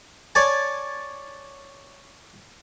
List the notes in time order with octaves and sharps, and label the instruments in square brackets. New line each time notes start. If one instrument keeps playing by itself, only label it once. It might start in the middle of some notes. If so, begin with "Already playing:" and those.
[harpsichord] C#5 D5 G#5 A5